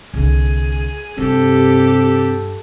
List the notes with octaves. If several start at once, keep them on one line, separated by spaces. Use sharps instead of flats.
C2 D3 G#4
G2 C3 G4 A4